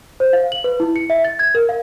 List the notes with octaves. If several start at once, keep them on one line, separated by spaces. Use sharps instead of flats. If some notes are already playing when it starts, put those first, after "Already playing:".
C5
F5
F#7
B4
E4
C#7
E5
A6
G#6
A#4
F5